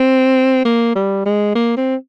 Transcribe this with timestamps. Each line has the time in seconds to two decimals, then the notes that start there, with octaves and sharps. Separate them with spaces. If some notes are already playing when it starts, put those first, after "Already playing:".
Already playing: C4
0.65 A#3
0.96 G3
1.26 G#3
1.55 A#3
1.77 C4